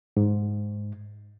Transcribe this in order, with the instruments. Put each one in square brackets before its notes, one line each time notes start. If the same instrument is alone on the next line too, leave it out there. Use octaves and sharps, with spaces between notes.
[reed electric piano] G#2